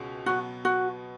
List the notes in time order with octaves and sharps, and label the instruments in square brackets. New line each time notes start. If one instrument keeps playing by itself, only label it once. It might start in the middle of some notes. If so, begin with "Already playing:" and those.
Already playing: [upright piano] C#2 B2 G#3 C#4 F#4
[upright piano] B2 F#3 B3 [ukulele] F#4
[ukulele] F#4